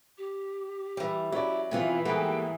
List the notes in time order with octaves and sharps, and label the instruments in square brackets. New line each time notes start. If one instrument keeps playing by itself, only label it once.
[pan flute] G4
[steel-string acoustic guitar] E3 G3
[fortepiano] F#3 C#4 D5 [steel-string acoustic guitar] E4
[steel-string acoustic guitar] C3 B3 F4 [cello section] E3
[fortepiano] G#2 G3 B3 [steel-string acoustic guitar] A#3 G4 A4 [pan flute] G5